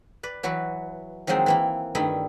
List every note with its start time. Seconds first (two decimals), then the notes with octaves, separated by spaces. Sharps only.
0.23 B4 D5
0.43 E3 F#3 F#4 B4
1.27 D#3 F3 F#3 G#3 C4 D#4
1.46 E3 A#3 E4
1.95 G2 D#3 A3 D#4 E4